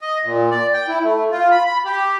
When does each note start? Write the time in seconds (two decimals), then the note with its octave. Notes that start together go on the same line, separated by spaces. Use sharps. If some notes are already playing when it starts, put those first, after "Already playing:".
0.01 D#5
0.24 A#2
0.51 D5
0.74 G5
0.88 E4
1.03 A3
1.31 F4
1.52 B5
1.66 B5
1.85 G4